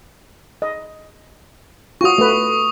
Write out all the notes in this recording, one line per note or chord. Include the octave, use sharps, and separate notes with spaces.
D#5
F4 F#4 C#6 D#6
A3 B4